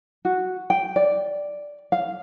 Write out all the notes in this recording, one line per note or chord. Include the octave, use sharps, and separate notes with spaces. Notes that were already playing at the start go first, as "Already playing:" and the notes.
F#4
G5
D5
F5